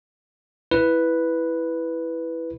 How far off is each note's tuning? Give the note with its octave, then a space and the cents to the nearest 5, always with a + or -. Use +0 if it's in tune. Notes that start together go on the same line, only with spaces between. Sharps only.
E4 +0 B4 +0